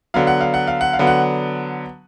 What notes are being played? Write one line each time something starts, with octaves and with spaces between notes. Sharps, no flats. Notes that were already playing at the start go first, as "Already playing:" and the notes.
D3 F#3 B3 F5
F#5
F5
F#5
F5
F#5
F5
D3 F#3 B3
F#5